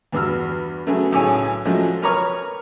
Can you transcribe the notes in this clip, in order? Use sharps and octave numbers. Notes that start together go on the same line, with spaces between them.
E2 G2 B3 F#4 E6 F6
C#3 F#3 A3 B3 C#4 G#4
B1 A2 C#3 G#4 C#5 G#5
F3 F#3 G#3 A3 C#4
A#4 B4 C#5 A#5 C#6 F6